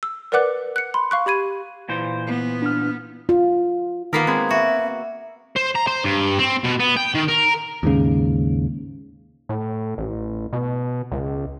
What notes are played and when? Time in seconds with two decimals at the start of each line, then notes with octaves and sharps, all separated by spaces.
0.03 E6
0.32 A#4 B4 D5 F#5 D6 F#6
0.76 F#6 C#7
0.94 B5 C6
1.11 F5 C#6 F#6
1.26 G4 B5 G#6 D#7
1.89 A#2 E3 C5
2.27 B3
2.62 D4 F6
3.29 F4
4.13 D#3 A#3 B3 A#4 B6 C7
4.27 G#3 C4 B5 G#6
4.51 F#4 E5
5.56 C5
5.76 A#5
5.87 C5
6.04 G2
6.39 C4
6.64 B2
6.80 B3
6.97 G5
7.15 D#3
7.28 A#4
7.83 D#2 G#2 C#3
9.49 A2
9.98 A1
10.53 B2
11.12 C#2